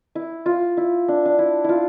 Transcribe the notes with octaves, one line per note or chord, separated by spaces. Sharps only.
E4
F4
E4
D4
D4
E4
E4 F4